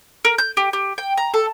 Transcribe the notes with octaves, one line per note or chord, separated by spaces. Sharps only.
A#4
G6
G4
G4
G5
A#5
A4